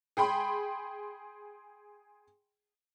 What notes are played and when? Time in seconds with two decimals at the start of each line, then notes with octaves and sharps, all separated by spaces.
0.17 G#4 G5 B5 C6